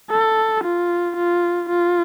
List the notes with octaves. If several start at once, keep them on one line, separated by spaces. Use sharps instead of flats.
A4
F4
F4
F4